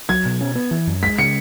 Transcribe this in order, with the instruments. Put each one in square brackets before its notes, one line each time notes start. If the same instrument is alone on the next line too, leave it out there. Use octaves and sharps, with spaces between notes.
[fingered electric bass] F#3 [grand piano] G#6
[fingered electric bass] B2
C#4
B3
E3
F#2
[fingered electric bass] G#3 [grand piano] B6
[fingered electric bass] C#3 [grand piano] C#7